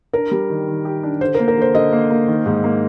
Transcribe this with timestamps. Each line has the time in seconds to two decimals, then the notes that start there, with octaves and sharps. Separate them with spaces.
0.13 D4 A#4
0.31 G3
0.50 D#3
0.68 D#3
0.85 G4
1.03 D4
1.21 D3 C5
1.35 A#4
1.39 A#3
1.48 A#4
1.57 D3 C5
1.74 D3 D#5
1.92 A#3
2.11 A#3
2.28 D#3
2.46 G#2
2.64 A#3